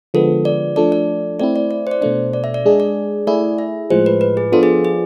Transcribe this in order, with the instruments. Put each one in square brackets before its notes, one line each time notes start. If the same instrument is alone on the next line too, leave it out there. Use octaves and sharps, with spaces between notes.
[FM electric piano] D3 F3 G#3 B3 [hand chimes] A4
[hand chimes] D5
[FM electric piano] F3 A3 D4 A4 [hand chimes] D5
[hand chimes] D5
[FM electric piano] A3 C4 E4 [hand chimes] D5
[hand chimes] D5
D5
C5
D5
[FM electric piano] B2 A3 D4 [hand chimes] C5
[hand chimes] D5
E5
D5
[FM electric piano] G#3 D4 G#4
[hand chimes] D5
[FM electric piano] A3 E4 G#4 [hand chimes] D5
[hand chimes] E5
[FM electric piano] A2 F3 G#3 [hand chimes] C5
[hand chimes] B4
B4
G#4
[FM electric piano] F3 B3 D4 F4 [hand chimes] A4
[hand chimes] G#4
G#4